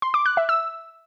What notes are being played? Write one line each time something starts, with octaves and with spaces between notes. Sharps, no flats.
C6
D6
F#6
E5
E6